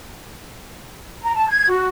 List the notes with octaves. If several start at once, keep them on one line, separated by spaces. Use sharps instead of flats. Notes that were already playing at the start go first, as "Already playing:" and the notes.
A#5
A5
G#6
F#4